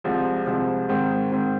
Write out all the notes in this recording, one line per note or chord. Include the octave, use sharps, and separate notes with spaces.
C2 C3 F3 G#3 C4
C2 C3 F3 G#3 C4
G#2 D#3 C4
G#2 D#3 C4